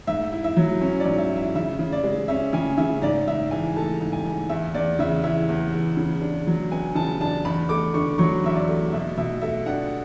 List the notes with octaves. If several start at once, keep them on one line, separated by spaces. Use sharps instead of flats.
G#2 E5
E4
E5
F#3
C#4
D5
G#2
E5
E4
E5
C#3 E5
C#3
D5
G#3
C#4 E5
C#3 G#5
C#3 E5
G#2 D5
G#2 E5
E3 G#5
A3 A5
G#2
G#5
G#2
E2 E5
E2 D5
C#3 E5
E3 E5
E2
E2
C#3
D4
F#3
B3 G#5
C#3 A5
D4 A5
E2 B5
A3 D6
D3 C#6
F#3 C#6
E2 E5
D5
A3
B2 E5
B2 E5
A3 E5
D4 F#5